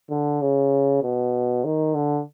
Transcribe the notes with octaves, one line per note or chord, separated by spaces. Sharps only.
D3
C#3
B2
D#3
D3